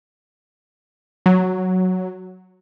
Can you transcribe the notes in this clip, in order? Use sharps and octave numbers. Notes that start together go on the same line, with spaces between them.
F#3